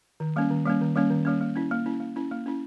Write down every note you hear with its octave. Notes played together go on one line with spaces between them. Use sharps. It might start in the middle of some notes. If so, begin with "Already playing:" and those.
D#3
G3 A#3 C#4
D#3
G3 A#3 C#4
D#3
G3 A#3 C#4
D#3
G3 A#3 C#4
A#3
C#4 E4
A#3
C#4 E4
A#3
C#4 E4
A#3
C#4 E4